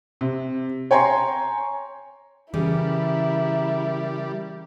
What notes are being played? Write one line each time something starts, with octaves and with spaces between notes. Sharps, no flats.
C3
C#5 G5 G#5 A#5 C6
C#3 E3 G3 E4 A#4